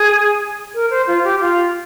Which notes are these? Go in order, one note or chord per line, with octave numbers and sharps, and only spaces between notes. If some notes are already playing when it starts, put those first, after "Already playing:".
Already playing: G#4
A#4
C5
F4
G4
F4